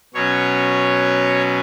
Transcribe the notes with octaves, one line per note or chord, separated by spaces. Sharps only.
B2 F#3 C#4 C#5